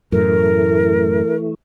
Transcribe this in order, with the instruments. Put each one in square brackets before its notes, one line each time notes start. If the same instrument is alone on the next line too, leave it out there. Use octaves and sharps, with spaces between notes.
[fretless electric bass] F#2 A2 [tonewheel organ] E3 A3 [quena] A#4